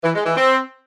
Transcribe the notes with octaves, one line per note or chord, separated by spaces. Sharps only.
E3
G#3
E3
C4